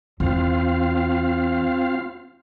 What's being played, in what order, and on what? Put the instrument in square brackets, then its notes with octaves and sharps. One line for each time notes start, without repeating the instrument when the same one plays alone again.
[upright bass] E2 [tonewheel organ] C4 F4 F5